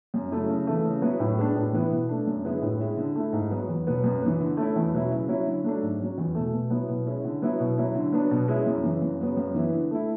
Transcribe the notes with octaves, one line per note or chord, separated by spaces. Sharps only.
F#2
C#3 F#3 A3 E4
C#3
E3 A3
C#3
F#3 B3 E4
A2
G#3 B3 D4
A2
E3 B3 E4
B2
A3 D4
F#2
D3 G#3 B3 E4
A2
G#3 C#4 E4
D3
A3 E4
G#2
F#3 B3
E2
B2 F#3 B3
F#2
E3 B3
D3
A3 C#4 E4
E2
B2 F#3 C#4 E4
C#3
F#3 C#4 E4
D3
F#3 A3 D4
G#2
F#3 C#4
E2
B2 A3
B2
F#3 B3 E4
B2
G#3 C#4 E4
D3
F#3 B3 E4
B2
F#3 C#4 E4
D3
F#3 B3 D4
B2
G#3 C#4 E4
F#2
C#3 E3
F#2
C#3 F#3 B3
F#2
E3 B3 E4
D3
A3 E4